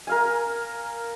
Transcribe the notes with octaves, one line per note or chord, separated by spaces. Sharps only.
A#4 F5 G#5